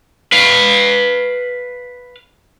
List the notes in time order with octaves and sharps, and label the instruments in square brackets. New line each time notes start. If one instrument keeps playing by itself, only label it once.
[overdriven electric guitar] B4 F5